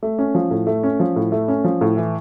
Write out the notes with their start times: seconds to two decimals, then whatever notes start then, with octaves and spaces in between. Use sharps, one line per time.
0.03 A3
0.19 C#4
0.35 F3
0.51 A2
0.67 A3
0.83 C#4
1.00 F3
1.16 A2
1.32 A3
1.48 C#4
1.64 F3
1.81 A2
1.97 E3